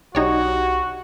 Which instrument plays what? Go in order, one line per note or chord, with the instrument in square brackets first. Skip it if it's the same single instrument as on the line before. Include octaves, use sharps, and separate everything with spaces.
[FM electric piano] B1 G4 [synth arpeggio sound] D#4 C#5 D5 [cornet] F#4